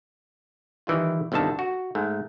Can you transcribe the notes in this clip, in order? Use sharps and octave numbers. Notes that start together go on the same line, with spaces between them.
D#3 E3 G3 F4
G1 C2 D3 D#3 A5
F#4
G#2 A3